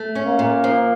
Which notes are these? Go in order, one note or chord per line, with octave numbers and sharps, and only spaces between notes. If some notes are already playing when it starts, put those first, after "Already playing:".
Already playing: A3
C#4
A#3
A#2
F3